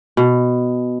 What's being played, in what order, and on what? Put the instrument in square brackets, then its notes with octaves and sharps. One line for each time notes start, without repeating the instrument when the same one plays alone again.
[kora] B2